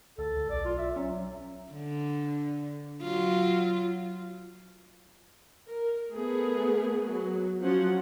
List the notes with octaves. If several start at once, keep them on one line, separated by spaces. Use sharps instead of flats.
D2 A4
D2
B1 D5
F4
E5
F#3 C#4
D3
F#3 F4
A#4
A3 B3 G#4 A#4
F#3
F3 F#3 C#4 F#5